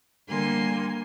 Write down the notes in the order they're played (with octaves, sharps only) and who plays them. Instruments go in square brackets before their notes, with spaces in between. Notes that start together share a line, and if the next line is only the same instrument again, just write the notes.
[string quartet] D3 G3 A#3 G#5 C6